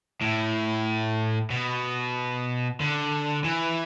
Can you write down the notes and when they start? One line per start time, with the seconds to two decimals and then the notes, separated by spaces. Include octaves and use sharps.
0.22 A2
1.50 B2
2.80 D3
3.44 E3